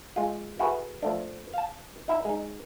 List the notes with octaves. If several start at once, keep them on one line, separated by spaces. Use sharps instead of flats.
G#3 F4
E4 F#4 G#4 A4 B4
F3 A3 D4
F5 A5
D#4 E4 E5
G#3 D#4